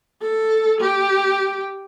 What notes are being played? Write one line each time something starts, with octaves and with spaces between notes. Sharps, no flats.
A4
G4